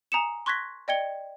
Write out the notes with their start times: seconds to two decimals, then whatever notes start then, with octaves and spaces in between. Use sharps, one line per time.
0.12 G#5 A#5 D#6 C#7 E7
0.46 C6 C#6 F#6 G#6 A#6 B6
0.88 D5 D#5 G5 G#6 C#7 G7